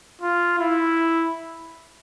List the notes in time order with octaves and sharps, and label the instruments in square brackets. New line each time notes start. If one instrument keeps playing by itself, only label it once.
[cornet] F4
E4